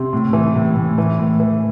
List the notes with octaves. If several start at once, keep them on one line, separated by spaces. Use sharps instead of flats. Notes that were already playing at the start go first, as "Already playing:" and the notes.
Already playing: C3 C6
A2
E3
A2
A2
E3
A2
E3